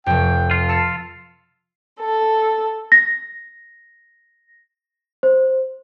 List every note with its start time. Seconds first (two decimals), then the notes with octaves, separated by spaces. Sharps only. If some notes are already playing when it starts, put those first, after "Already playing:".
0.06 F1 F2 G5
0.51 F4
0.69 A5 E6 C7 C#7
2.01 A4
2.92 A#6
5.23 C5